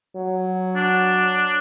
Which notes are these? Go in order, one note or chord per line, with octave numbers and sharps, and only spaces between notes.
F#3
D4